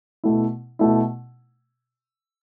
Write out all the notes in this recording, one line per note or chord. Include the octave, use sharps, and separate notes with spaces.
B2 A3 E4
B2 A3 E4